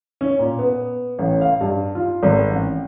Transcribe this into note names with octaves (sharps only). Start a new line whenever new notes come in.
C#4
A#2
B3
A1
F5
G2
F4
G#1
A1